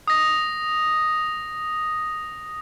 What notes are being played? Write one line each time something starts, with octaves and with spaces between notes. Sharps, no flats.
D#6 A#6